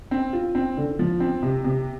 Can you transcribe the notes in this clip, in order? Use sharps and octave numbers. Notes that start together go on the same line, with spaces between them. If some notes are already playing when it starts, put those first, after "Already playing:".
C4
F4
C4
D3
F3
C4
C3
C3